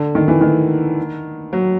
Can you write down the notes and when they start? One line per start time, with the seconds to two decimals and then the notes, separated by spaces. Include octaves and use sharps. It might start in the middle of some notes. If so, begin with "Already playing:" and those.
Already playing: D3
0.15 D#3
0.28 E3
0.41 D#3
1.53 F#3